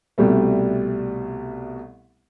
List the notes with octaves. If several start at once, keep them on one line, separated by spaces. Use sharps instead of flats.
C2 B2 G3 A3